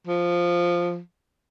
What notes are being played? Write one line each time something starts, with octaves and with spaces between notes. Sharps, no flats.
F3